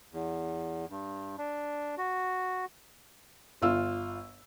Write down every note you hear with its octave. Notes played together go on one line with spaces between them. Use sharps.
E2
G2
D4
F#4
G1 F4 E6